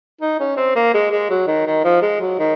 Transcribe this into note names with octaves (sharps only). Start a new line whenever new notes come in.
D#4
C#4
C4
A#3
G#3
G#3
F#3
D#3
D#3
F3
G#3
F#3
D#3